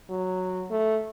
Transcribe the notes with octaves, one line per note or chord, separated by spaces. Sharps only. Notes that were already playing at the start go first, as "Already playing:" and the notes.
F#3
A3